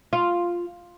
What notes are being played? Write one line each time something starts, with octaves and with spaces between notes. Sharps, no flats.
F4